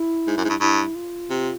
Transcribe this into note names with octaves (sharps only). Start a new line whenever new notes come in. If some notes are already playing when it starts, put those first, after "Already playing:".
Already playing: E4
G#2
F#2
G#2
G2
G2 E4
F4
C3